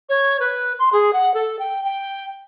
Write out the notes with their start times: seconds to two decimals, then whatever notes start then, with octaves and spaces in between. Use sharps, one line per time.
0.09 C#5
0.40 B4
0.79 C6
0.92 G#4
1.13 F#5
1.34 A4
1.59 G5
1.84 G5